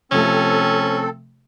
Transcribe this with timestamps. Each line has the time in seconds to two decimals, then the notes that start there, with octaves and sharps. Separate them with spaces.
0.12 C3 F3 A3 C4 C#4 A4